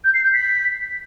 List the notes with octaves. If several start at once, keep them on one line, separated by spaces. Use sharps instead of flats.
G6
C7
G6
B6